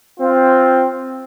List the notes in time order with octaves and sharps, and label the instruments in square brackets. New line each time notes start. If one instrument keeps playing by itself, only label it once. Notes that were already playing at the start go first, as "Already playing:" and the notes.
[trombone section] C4 F4